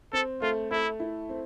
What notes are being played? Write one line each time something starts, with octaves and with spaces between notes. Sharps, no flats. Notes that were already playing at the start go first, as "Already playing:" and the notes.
C4 A4
A3 F4
A3 E4
E4
C4